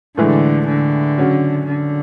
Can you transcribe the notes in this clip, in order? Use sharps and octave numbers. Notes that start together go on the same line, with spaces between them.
A2 D3 E3 G#3
D3
C#3 F#3 C#4 F#4
D3